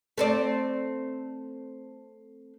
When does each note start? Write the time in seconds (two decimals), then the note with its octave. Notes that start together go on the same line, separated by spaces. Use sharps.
0.18 A3 C4 D5